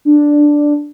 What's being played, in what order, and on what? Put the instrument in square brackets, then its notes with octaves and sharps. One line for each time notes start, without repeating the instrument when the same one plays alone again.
[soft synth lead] D4